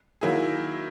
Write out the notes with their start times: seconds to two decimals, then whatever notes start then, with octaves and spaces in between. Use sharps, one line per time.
0.21 D#3 F#3 A#3 E4 G#4